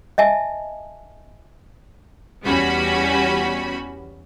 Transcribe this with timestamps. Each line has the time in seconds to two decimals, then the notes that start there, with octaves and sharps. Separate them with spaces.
0.18 D#5 E5 G#5 A5
2.45 E2 G3 C#4 F#4 B5